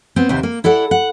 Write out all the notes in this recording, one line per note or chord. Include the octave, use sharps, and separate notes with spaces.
B3 C4
D#2 C3 B3 C4
A#3
E4 A4 D5 F#5
F#5